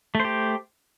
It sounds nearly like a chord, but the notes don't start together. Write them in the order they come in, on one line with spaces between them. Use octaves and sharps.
A3 C5 G4